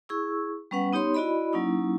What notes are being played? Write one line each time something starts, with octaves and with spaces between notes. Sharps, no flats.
E4 G#4 C#6 E6
G3 B3 C#4 B4 F#5
B3 D#4 G4 C#5 C6
E4 F#4 D5 D#5 B5
F#3 A#3 C#4 D#4 E4